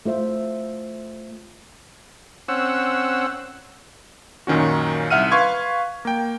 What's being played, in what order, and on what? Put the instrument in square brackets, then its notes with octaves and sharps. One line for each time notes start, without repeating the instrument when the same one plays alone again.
[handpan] A3 F4 C5 E5
[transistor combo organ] C4 C#4 F#5 E6
[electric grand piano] F#2 A#2 D#3 C#4 F#4
C2 E5 F#5 F6 D#7
B4 F5 C6 C#6 G#6
A#3 G5